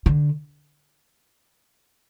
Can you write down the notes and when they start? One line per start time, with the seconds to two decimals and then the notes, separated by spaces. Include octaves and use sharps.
0.06 D3